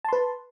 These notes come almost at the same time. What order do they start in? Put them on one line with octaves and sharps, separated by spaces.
A5 C6 B4